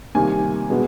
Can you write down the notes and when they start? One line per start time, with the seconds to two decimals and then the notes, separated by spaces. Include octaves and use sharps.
0.15 C3 D#3 G3 A#3 G#5
0.70 B2 G#3 B3